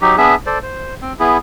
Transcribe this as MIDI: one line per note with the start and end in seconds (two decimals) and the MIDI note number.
0.01 0.16 54
0.01 0.16 63
0.01 0.16 67
0.18 0.35 59
0.18 0.35 62
0.18 0.35 68
0.18 0.35 76
0.46 0.58 69
0.46 0.58 72
0.46 0.58 74
0.63 0.94 72
1.02 1.13 60
1.20 1.38 59
1.20 1.38 64
1.20 1.38 68